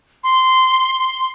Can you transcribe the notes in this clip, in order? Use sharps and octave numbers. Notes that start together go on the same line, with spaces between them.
C6